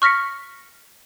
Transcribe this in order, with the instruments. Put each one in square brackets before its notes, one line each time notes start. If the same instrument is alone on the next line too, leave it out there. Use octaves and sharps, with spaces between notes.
[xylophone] C#6 F6 A#6 B6 C#7